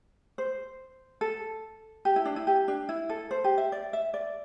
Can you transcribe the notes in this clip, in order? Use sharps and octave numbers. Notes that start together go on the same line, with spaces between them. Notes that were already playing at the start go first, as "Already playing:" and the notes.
C5
A4
G4
E4
D4
E4
G4
D4
E4
A4
C5
G4
E5
D5
E5
D5